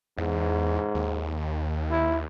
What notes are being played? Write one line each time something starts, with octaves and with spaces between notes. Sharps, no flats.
E2 G#2
D#2
E4